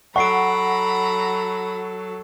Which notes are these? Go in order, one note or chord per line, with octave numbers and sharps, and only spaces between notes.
F#3 A4 F#5 A#5 B5 C#6 C7 D7